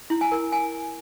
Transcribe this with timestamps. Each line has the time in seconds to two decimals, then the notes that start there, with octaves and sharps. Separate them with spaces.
0.10 E4
0.21 G#5
0.32 A#4
0.52 G#5